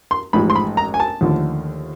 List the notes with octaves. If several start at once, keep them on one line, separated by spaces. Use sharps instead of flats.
C6
A1 G#2 F3 B5
C6
B5
A#5
G#5
A5
D#2 D3 F3 A3